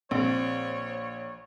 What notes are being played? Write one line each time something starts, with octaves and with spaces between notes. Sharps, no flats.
A#1 C4 C#5